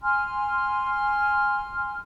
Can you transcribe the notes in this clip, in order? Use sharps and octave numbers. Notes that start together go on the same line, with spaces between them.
G#5 C6 F6